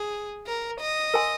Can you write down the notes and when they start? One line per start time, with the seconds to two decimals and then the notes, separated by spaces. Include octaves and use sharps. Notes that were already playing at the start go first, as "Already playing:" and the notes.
Already playing: G#4
0.47 A#4
0.80 D#5
1.14 A#4 G#5 C6